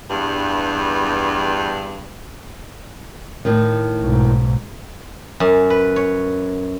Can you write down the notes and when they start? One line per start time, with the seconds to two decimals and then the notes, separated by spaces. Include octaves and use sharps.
0.11 E2 G2
3.45 A2 D#3
4.03 B1 G#2
5.40 F#2
5.70 B4
5.96 C#5